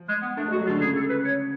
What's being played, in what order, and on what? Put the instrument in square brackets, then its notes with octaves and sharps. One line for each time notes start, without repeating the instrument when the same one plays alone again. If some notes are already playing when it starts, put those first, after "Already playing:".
Already playing: [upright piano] F3
[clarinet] G#3
B3
[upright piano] A3 [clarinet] D4
[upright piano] G#3 [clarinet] F#4
[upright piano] F#3
[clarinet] F4
[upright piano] D3
[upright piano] C#3 [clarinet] G#4
[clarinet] A4
B4
C#5